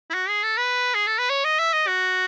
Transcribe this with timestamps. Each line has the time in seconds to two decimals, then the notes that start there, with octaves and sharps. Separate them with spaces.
0.10 E4
0.14 F#4
0.29 G#4
0.43 A4
0.58 B4
0.95 G#4
1.07 A4
1.19 B4
1.30 C#5
1.45 D#5
1.59 E5
1.73 D#5
1.88 F#4